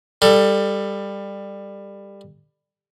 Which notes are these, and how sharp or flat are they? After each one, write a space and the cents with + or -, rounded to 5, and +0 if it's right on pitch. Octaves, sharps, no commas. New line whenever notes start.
G3 +20 A4 +20